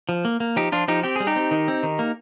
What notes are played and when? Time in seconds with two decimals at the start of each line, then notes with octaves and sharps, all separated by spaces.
0.09 F3
0.25 A#3
0.40 A#3
0.56 F3 D#4 G4
0.72 F3 D4 F4
0.88 F3 D#4 G4
1.03 C4 G4
1.16 G3 G#4
1.27 D#4 G4
1.36 C4
1.51 D#3
1.68 C4
1.83 D#3
1.99 A#3